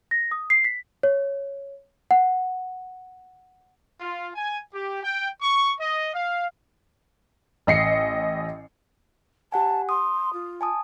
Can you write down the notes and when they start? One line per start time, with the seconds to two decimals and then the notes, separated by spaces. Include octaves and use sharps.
0.11 A#6
0.31 D#6
0.50 C7
0.65 B6
1.03 C#5
2.11 F#5
4.01 F4
4.35 G#5
4.74 G4
5.03 G5
5.42 C#6
5.80 D#5
6.14 F5
7.67 A1 D#5 C7 C#7
9.52 G4 F#5 G#5 A5
9.89 C6 D#6
10.33 F4
10.61 G#5 A5 D#6